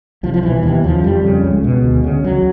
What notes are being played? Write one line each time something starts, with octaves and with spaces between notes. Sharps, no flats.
C2 F3
F3
B2 E3
D#2 E3
C#3 F3
F2 G3
C#3
C#2 G#3
B2
D2
C#3
C#2 F#3